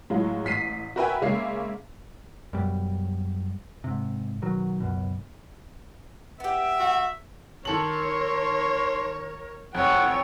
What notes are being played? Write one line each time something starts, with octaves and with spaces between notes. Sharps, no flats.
A2 F#3 G#3 F4
A1 B6 C7 D#7
F#4 A#4 B4 E5 G5 G#5
C#3 G#3 A#3 C#4 E5 C7
F#2 B2 G3
G#2 C3
B2 D#3 F#3
C#2 F#2 B2
B3 G4 E5
F#4
D#3 A4 A#4 C#5 C6 F#7
F1 F2 C#5 F#5 G5